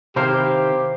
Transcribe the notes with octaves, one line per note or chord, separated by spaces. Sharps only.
C3 D#3 E4 G4 A#4 C5 F5